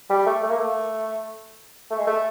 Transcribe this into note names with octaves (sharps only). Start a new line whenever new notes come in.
G3
A3
A3
A#3
A3
A3
G#3
A3